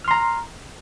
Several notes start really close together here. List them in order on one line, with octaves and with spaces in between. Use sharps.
F6 C6 A#5